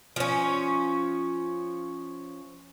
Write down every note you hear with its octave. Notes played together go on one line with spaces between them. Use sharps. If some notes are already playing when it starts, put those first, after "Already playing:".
F3 C#4